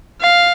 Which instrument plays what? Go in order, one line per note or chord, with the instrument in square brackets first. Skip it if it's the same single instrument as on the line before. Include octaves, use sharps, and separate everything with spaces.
[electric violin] F5